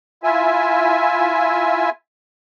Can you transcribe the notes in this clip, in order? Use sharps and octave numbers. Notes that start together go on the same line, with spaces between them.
E4 F4 E5 G#5